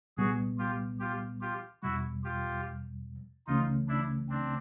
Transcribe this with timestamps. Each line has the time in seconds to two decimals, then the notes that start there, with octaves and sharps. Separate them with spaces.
0.17 C2 A#2 G3 B3 F#4 G#4
0.58 F4 G4
0.99 F4 G4
1.41 F4 G4
1.82 E2 B2 G3 E4 F#4
2.24 F4 G4
3.47 C#2 C#3 E3 A3 C#4 D#4 F4
3.88 D4 E4
4.29 C4 D4